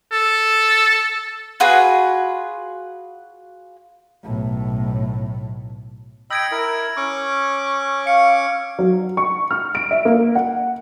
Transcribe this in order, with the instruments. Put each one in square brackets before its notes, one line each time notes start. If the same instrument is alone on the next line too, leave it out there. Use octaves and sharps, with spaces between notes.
[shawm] A4
[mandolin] F4 F#4 G#4 B4
[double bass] B1 A2
[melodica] D#5 G5 B5 [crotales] E6 G#6 D7
[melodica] E4 A#4
C#4 C#6 D6
[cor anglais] F5 [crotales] C#7
[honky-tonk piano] F#3
C#6
F6
D7
E5
A#3
F#5